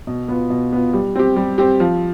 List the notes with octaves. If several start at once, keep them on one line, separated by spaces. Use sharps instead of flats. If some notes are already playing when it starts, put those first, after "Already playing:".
B2
B3 F4
B2
B3 F4
G3
C4 G4
G3
C4 G4
F3